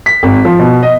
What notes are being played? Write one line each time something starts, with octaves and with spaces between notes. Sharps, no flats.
B6
G#1
F3
B2
D#5